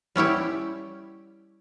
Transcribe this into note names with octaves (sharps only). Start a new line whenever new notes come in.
G3 C#4 E4 G4